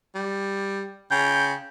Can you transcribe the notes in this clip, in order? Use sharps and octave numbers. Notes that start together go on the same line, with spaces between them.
G3
C#3 G5